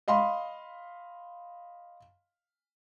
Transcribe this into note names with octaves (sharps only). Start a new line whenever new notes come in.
D#5 F5 B5 C6